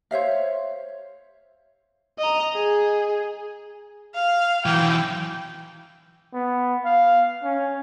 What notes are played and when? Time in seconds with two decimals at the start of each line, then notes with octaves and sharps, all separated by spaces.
0.11 C5 C#5 E5 F5
2.19 D#5 A#5
2.54 G#4
4.15 F5
4.66 E3 F#3 G5
6.33 B3
6.85 F5
7.43 C#4